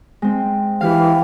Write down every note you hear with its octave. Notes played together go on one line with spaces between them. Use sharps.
G#3 C4
E3 E4 G4 F5